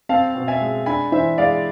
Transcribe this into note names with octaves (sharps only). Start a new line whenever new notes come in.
C4 F5 A5
B2
E5 G#5
G#3
D4 G#5 B5
E3 C5 E5
G#3 D5 F5